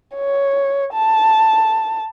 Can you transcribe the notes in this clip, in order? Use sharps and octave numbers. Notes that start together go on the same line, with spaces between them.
C#5
A5